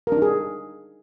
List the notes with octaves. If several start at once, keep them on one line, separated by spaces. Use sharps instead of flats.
D4 D#4 G#4 A#4